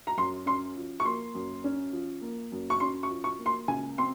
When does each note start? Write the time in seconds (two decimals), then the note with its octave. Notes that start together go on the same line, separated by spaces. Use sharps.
0.07 A#5
0.17 F#2 C6
0.46 C#4 C6
0.76 F3
1.00 C#6
1.05 A#3 C6
1.35 F#2
1.64 C#4
1.93 F3
2.22 A#3
2.52 F#2
2.70 C#6
2.80 C#4 C6
3.03 C#6
3.10 F3
3.24 C#6
3.39 A#3
3.46 C6
3.68 C#2 G#5
3.98 C4 C6